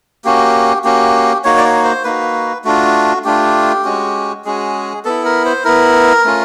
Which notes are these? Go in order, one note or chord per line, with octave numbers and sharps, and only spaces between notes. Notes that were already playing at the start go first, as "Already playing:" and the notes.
A#3 C#4 F#4 G4
A#3 C#4 F#4 G4
A#3 D#4 F#4 C#5
D5
C#5
C5
A#3 D#4 F#4 B4
A3 D4 F4 F#4
A3 D4 F4 G4
G#3 C#4 F#4
G#3 C#4 F#4 G#4
B3 E4 A4
A#4
C5
B3 E4 A#4
A3 C#4 F4